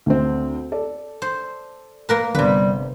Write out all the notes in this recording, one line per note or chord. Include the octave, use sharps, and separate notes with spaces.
D2 C4
A4 D5
C5
A#3 A#4 B4
G1 C3 G3 B4